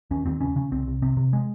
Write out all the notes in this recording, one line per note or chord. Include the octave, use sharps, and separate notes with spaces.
D#2 C#4
D#2 C4
C#3 C#4
C#3 C#4
C2 C4
C2
C3 C4
C3
G#3